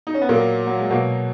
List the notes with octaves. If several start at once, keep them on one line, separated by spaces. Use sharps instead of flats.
D#4
C#4
B3
A#2 F#3 A#3
F#3
G#3
B2 F#3 A#3